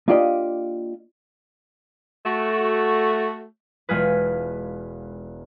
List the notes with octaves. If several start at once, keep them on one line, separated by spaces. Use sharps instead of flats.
A#3 D4 F4 G4 D5 D#5
A3 F#4
E1 G#3 F4 G#4 B4